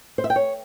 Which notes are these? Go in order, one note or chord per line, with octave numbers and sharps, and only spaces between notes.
C5
E5
G5
C#5